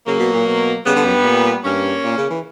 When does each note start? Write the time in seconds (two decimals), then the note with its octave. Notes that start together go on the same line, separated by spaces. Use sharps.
0.06 C#3 F#3 A#3
0.19 B2
0.33 A#2
0.45 B2
0.85 C#3 G3 B3
0.96 D3
1.05 F#2
1.15 G2
1.24 A#2
1.64 G2 A#3 C#4
2.04 A#2
2.17 C#3
2.30 E3